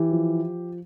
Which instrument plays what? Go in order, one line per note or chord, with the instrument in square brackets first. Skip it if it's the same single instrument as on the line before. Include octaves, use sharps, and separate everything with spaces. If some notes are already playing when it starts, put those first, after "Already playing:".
Already playing: [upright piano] E3 G4
F3